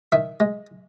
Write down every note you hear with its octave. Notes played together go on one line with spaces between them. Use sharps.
D#3 E5
G#3